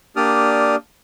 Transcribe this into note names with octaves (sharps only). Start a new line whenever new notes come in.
A#3 D4 G4 D5 D#6 F6